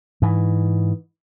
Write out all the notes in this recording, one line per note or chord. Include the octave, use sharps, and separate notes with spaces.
G#2 E3